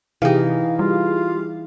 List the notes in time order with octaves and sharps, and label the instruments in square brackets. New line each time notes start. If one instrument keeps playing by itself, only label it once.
[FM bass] C3 [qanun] E3 D#4 [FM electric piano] G4 G#4 F5
[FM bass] G3 [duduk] F4